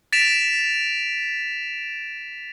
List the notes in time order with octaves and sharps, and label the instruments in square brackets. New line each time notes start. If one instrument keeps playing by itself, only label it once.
[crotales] A6 B6 D7 E7 F7